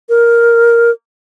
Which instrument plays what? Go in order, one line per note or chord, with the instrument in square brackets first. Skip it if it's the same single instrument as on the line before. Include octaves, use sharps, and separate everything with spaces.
[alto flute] A#4